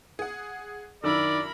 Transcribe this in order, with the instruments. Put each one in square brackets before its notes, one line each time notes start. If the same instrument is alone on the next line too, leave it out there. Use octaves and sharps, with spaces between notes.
[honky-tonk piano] G#4 F#5
[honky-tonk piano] F#2 D4 E4 [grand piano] D#3 E6 [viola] A#4 B5 [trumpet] D5